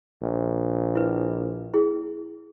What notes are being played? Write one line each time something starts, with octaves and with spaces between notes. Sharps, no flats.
A#1
E4 B4
E4 G#4